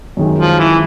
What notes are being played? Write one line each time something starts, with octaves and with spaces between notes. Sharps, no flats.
F#2 D#3 G#3
F3
E3